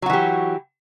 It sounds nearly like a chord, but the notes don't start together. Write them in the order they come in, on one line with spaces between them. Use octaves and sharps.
F#3 F#4 E3 G4